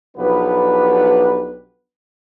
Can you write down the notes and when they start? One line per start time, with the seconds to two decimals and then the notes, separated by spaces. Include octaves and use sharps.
0.17 B1 F3 B3 D4 G4 B4